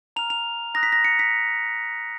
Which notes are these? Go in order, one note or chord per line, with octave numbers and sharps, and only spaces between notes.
A#5 F6 F7
F7
A#5 D#6 F#6 A#6
B6
A#6
C#7
B6